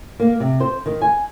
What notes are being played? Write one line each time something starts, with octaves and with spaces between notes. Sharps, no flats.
A#3
C3
C5
D#3
G#5